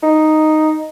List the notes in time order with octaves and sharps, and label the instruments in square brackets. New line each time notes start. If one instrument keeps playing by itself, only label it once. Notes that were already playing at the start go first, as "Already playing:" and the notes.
[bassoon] D#4